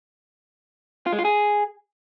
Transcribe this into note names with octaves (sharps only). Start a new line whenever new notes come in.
F4
G#3
F4
G#4